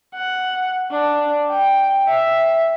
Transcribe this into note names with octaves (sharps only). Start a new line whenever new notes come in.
F#5
D4
G5
E5